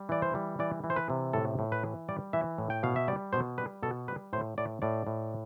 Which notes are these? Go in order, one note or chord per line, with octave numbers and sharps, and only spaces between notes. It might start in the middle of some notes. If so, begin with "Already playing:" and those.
Already playing: G3
E3 D5
C5
G3
E3 D5
E3
C5
B4
C3
A2 A4
A2
B4
E3
G3 D5
E3 E5
A2
G5
B2 F5
E5
G3 D5
B2 C5
G3 B4
B2 A4
G3 B4
A2 C5
A2 D5
A2 D5
A2